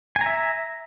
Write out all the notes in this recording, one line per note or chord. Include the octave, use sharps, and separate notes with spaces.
E5 G#5 A#5